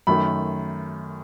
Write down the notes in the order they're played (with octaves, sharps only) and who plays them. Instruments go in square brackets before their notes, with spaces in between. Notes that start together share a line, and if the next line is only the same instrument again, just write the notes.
[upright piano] F#2 D#3 A3 B5